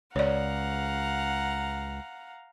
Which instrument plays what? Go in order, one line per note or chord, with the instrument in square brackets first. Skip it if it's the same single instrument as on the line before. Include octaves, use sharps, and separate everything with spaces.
[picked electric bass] C#2 [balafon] C#5 D5 [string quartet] F5 F#5 A#5